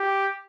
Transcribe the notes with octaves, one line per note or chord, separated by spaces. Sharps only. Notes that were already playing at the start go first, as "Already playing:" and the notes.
Already playing: G4